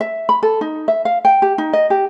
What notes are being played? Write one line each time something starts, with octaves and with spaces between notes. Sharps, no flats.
E5
B5
A4
D#4
E5
F5
G5
G4
D#4
D#5
G4